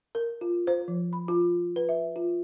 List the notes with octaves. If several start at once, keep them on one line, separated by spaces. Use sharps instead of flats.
A#4
F4
C5
F3
B5
F4
B4
E5
F4